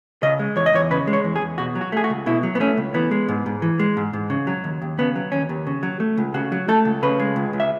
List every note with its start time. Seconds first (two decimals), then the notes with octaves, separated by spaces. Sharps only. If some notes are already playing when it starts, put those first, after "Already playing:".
0.23 C#3 D#5
0.39 G#3
0.56 E2 C#5
0.66 D#5
0.73 E2 C#5
0.91 C#3 B4
1.07 G#3
1.13 C#5
1.25 E2
1.36 G#4
1.41 E2
1.58 B2 F#4
1.75 F#3
1.81 F#4
1.92 A3 G#4
2.04 F#4
2.10 C#2
2.26 B2 E4
2.43 F#3
2.55 B3
2.60 A3 C#4
2.77 C#2
2.94 E3 B3
3.11 G#3
3.29 G#2
3.46 G#2
3.62 E3
3.79 G#3
3.97 G#2
4.13 G#2
4.30 C#3
4.47 F#3
4.64 D#2
4.82 D#2
4.98 C#3 B3
5.16 F#3
5.32 D#2 C#4
5.49 D#2
5.67 C#3
5.83 F#3
6.00 A3
6.17 C#2
6.34 C#3 F#4
6.52 F#3
6.68 A3 A4
6.85 C#2
7.03 C#3 B4
7.20 G#3
7.36 C#2
7.53 C#2
7.60 E5